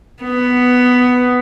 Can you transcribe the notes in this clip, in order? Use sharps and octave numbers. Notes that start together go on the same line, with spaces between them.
B3